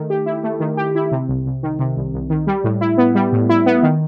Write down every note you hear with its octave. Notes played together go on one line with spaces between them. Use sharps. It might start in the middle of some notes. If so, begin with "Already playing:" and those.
Already playing: D#3 A3
G4
E4
A3
D#3
G4
E4
C3
C2
C2
D#3
C3
C2
C2
D#3
G3
A2
E4
B3
G3
A2
E4
B3
D#3